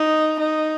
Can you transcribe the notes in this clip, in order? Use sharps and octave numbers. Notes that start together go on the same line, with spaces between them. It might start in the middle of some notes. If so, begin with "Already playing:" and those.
Already playing: D#4
D#4